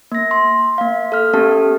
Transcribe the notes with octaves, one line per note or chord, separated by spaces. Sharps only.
A#3 A#6
C6
A#3 F5
A4 F6
A#3 B3 C#4 G4 A4 A5